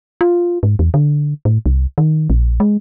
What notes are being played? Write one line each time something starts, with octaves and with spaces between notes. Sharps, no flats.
F4
G#2
E2
D3
A2
C2
D#3
A#1
G#3